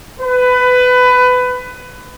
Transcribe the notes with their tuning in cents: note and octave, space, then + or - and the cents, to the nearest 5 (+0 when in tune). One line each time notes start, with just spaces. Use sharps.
B4 +20